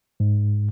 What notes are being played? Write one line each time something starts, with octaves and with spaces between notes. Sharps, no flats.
G#2